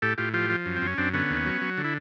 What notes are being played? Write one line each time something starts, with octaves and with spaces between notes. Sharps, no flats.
A2 G4 A4
A2 F4 G4
F3 F4 G4
F3
F#2
C4
F#2
C#4
F#2 C4 D4
D3 B3 C#4
D#2
F#3
F#3
D3
E4